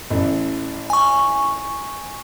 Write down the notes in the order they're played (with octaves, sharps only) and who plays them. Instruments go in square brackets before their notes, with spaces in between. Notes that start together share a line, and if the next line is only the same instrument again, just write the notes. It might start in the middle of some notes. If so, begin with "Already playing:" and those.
[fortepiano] A1
[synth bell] G#5 C#6